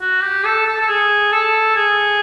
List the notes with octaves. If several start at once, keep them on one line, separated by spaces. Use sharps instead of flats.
F#4
G4
A4
A4
A4
G#4
A4
G#4